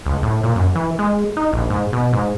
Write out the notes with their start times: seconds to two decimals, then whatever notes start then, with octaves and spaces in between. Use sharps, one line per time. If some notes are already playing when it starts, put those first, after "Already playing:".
0.06 C#2
0.23 A2
0.43 A#2
0.56 F#2
0.75 E3
0.99 G#3
1.37 D#4
1.53 A#1
1.70 G#2
1.93 B2
2.13 G#2